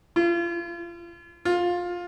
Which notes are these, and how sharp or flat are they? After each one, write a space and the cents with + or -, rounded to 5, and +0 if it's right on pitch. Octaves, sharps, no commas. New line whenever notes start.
F4 -35
F4 +15